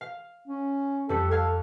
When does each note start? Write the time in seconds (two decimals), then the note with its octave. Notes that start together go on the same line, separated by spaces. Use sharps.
0.01 F5
0.48 C#4
1.09 F2 G3 A4 C#7
1.31 A4 F5 G#6